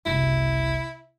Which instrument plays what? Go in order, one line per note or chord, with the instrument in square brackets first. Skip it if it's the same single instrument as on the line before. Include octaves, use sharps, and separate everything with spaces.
[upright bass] F#1 C2 [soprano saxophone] E4